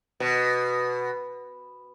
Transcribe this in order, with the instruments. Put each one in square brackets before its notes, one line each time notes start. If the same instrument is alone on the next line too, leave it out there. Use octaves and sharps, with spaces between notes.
[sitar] B2